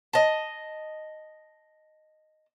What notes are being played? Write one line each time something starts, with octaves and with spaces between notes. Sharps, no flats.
D#5 A5